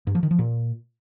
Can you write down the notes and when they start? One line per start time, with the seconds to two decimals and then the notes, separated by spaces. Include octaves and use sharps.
0.07 G2
0.15 F3
0.23 D#3
0.31 F3
0.39 A#2